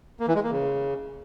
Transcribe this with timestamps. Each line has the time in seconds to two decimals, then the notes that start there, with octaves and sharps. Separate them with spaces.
0.20 A#3
0.27 E3
0.35 G#3
0.43 A#3
0.51 C#3